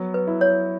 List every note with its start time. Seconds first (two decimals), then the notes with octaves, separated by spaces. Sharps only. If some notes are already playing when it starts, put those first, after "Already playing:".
Already playing: F#3 B3
0.14 B4
0.27 E4
0.41 C#5